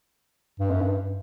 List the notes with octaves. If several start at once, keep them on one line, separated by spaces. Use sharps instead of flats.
G2
F#2
G2